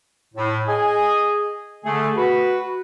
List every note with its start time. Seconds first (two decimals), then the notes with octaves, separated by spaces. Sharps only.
0.34 A2
0.66 G#4 D#5 G#5
1.84 D3 A3 G#4
2.16 F#4 B4